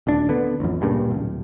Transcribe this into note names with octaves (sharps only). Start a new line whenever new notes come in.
D#1 D2 D4
D3 B3
A1 F2
D1 G2 A#2 C#3
D1 A#1